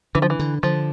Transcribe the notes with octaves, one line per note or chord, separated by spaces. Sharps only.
D3 E3
F3
E3
D3
D3 F3